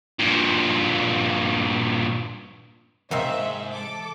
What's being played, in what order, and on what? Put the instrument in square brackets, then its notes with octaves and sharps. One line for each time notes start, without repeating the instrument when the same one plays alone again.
[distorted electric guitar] G2 A#2
[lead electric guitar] G#2 [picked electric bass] C3 E3 [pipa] D#3 A#3 C4 [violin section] E5
[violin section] A4 D6